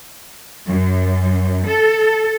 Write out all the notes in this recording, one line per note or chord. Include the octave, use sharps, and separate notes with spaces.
F#2
A4